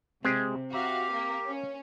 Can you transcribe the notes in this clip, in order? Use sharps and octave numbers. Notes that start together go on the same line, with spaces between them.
C3 G#3 C4 G4 G#4
F#4 G4 E5 F5 A#5
A#3
C#4